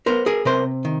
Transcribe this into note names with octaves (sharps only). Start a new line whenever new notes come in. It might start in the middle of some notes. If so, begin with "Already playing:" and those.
B3 A#4 C5
G#4 A#4
C3 A#4 C5
D#3